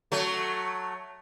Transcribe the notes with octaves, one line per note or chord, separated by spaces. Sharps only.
F#3 A3